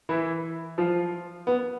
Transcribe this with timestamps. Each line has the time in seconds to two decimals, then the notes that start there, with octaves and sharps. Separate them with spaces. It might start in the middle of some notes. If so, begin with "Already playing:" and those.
0.09 E3 E4
0.78 F3 F4
1.47 B3